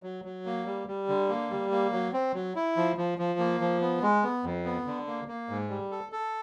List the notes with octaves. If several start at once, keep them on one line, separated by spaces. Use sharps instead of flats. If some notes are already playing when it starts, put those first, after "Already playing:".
F#3
F#3
A#3
G3
G3
D3
A#3
G3
A#3
F#3
C4
F#3
E4
F3
F3
F3
A#3
F3
B3
G#3
B3
F2
B3
D3
A#3
A#3
G#2
G3
A4
A4